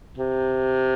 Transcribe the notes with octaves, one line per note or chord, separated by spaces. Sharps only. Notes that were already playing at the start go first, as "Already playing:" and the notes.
C3